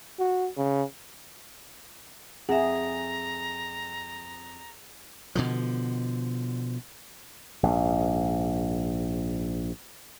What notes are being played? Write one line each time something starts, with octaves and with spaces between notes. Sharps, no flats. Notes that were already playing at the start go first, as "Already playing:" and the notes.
F#4
C#3
F2 G#4 E5 F#5 A#5
B2 D3 F3
A#1 G#2